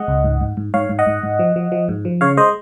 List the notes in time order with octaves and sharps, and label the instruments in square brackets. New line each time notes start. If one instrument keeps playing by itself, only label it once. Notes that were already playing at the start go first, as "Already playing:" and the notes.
Already playing: [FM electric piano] G#3 D#5 F#5
C#2
G#2
G#2
G#2
G#2 C#5 F5
G#2
D#5 F#5
G#2
G#2
F3
F3
F3
G#2
F3
C#3 C#5 F5
G#3 C5 D#5